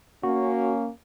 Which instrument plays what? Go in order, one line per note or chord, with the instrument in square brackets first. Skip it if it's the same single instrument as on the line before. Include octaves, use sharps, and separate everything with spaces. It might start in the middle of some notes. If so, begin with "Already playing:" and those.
[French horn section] A#3 C#4 [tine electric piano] F#4